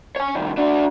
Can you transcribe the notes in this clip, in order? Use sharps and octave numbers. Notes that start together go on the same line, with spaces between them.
C#5 G#5
C2 D#3
D4 F#4